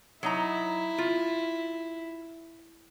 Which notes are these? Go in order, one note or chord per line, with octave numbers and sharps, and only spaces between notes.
F#3 D#4 E4 A#5
F4